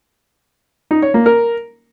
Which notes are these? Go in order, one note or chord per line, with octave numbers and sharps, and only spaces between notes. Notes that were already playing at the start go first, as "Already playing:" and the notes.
D#4
C#5
A#3
A#4